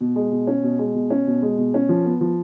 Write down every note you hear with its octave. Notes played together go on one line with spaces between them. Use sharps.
B2
G#3
B2
C#4
B2
G#3
B2
C#4
B2
G#3
B2
C#4
F3
B3
F3